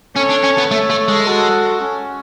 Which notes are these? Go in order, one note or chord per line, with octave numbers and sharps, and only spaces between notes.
C#4 A4 C#5
D4
C#4
B3
A3 A4 C#5
A3
G#3
F#4 A4
C#4